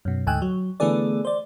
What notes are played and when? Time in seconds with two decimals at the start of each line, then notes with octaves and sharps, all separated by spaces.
0.05 F#2 B2
0.27 D2 G#2 G5 G#5 E6 F#6
0.42 F#3
0.80 D3 E3 A3 B3 G#4 D5
1.25 C5 D5